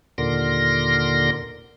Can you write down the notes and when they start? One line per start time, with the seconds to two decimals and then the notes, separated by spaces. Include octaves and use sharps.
0.18 D#2 A#2 D3 A#4 C6 A#6